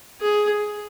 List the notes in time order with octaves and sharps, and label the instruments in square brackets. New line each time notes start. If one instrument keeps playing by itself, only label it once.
[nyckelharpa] G#4